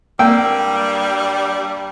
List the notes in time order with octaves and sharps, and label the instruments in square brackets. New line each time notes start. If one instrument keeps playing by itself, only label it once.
[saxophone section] G2 G3 [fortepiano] A#3 G5 E6